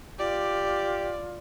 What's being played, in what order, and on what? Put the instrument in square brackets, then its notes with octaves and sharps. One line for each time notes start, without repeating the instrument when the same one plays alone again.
[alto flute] F4 [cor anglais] G4 [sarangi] D5